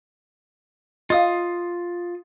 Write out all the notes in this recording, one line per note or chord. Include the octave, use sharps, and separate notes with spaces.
F4 D#5 F5 D#6